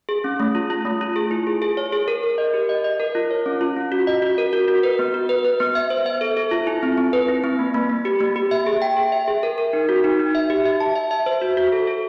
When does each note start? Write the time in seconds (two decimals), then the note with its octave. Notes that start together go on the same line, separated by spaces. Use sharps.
0.09 G#4
0.24 C#4
0.40 A3
0.55 F4
0.70 F4
0.85 A3
1.01 F4
1.16 G#4
1.31 E4
1.47 G#4
1.62 G#4
1.77 C#5
1.92 G#4
2.08 A#4
2.23 A#4
2.38 D#5
2.53 G4
2.69 D#5
2.84 D#5
3.00 A#4
3.15 F4
3.31 C#5
3.46 C#4
3.61 F4
3.76 C#4
3.92 F#4
4.07 D#5
4.22 F#4
4.38 A#4
4.53 F#4
4.68 F#4
4.83 B4
4.99 B3
5.14 F#4
5.29 B4
5.45 B4
5.60 B3
5.75 E5
5.90 C5
6.06 E5
6.21 A4
6.37 A4
6.51 F4
6.67 E4
6.83 C4
6.97 C4
7.13 B4
7.28 E4
7.44 C4
7.59 A#3
7.74 A#3
7.90 A#3
8.05 G4
8.20 A#3
8.36 G4
8.51 E5
8.67 G#4
8.82 G5
8.97 G#4
9.12 E5
9.28 G#4
9.43 A#4
9.58 A#4
9.73 D#4
9.89 F#4
10.04 D#4
10.19 D#4
10.35 E5
10.50 G4
10.65 E5
10.80 A5
10.96 E5
11.11 E5
11.26 C5
11.42 F#4
11.57 F#4
11.72 A4
11.87 A4